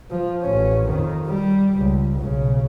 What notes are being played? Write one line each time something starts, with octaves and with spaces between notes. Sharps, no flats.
F3
A1 C#4
F2 D#3
G3
C#2
B1 C#3